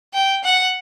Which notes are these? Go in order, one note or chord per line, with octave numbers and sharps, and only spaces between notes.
G5
F#5